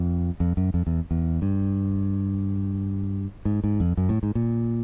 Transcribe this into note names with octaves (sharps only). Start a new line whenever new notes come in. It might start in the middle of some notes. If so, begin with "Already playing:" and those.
Already playing: F2
F2
F#2
F2
E2
E2
G2
G#2
G#2
F2
F#2
A2
G#2
A#2